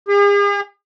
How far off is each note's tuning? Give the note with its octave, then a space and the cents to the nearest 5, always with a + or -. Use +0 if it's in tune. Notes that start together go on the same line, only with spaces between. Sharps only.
G#4 -45